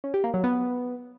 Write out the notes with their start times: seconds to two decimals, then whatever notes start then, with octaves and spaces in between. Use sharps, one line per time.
0.04 C#4
0.14 G4
0.24 A#3
0.34 F#3
0.44 B3